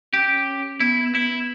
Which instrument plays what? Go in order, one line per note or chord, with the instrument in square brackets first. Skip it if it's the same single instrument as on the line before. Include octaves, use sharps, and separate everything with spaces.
[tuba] C#4 [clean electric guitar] G4
[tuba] B3 [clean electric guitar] E4
[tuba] B3 [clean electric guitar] E4